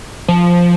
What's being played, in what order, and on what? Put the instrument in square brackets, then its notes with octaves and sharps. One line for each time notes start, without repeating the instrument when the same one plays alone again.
[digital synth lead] F3